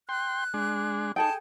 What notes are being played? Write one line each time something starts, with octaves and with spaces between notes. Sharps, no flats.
G5 C6 F#6
G#3 D4
D#4 G#4 A4 G5 A5